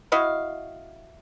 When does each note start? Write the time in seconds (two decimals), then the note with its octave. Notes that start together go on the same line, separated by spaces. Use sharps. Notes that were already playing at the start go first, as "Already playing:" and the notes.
0.12 E4 F#4 D#5 F5